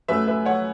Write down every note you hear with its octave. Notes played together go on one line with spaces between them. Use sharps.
F#2 F#3 A3 B4 E5
B4 E5
C#5 F#5